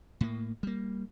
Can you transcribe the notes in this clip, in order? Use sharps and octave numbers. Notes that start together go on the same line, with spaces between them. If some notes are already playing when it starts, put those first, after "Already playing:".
A2 A#3
G3 A#3